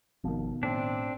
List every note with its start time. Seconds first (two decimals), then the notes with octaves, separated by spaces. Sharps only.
0.24 G1 B2 D#3 F3
0.63 A2 C4 D4